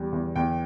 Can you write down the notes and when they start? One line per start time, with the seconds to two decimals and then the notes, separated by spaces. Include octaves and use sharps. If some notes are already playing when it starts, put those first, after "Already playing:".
Already playing: E2 G3
0.12 E2
0.36 E2 G5